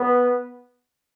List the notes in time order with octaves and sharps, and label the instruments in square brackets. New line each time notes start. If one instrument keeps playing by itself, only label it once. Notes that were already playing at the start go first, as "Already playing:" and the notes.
Already playing: [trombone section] B3